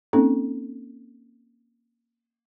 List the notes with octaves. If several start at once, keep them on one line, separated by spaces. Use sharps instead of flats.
A#3 C4 C#4 D#4 A4